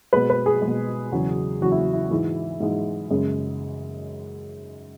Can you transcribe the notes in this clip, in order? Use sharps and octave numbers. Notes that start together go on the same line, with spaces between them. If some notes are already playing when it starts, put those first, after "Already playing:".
B2 G#3 B4
B4
G#4
G#3
B2
E2 C#3 F#3
E2 C#3 F#3 F#4
E4
E4
G#2 E3 G#3
G#2 E3 G#3
F#2 C#3 G#3